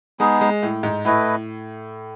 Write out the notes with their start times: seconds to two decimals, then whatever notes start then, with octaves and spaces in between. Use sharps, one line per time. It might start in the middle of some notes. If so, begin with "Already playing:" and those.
0.19 G#3 B3 D#4 G#4
0.41 G#3
0.63 A2
0.83 G#2
1.05 A2 A3 E4 B4 D#5